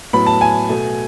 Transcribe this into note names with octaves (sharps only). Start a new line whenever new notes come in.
A2 F#3 B3 B5
A5
G#5
B2 A3